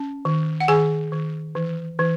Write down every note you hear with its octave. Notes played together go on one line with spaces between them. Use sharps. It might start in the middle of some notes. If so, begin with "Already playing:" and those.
Already playing: C#4
D#3
F#5
D#3 G#4 G#5
D#3
E3
E3